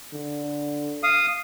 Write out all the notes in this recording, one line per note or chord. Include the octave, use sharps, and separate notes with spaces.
D3
F5 D#6